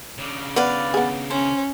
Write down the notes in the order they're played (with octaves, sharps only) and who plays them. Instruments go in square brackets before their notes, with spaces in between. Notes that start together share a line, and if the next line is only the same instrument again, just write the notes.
[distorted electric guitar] C#3 D4
[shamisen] B3 [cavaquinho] B4 D5 F5
[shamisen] B3 G#4
[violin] C#4 [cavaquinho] C5